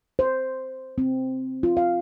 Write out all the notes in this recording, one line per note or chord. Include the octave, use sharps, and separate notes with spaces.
C5
C4
F4
F5